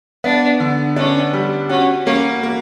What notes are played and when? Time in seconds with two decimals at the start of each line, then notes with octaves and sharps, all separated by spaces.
0.24 B3 D4
0.60 D3
0.96 C#4 D4
1.33 G3
1.69 C#4 F#4
2.06 A#3 C#4
2.43 A#3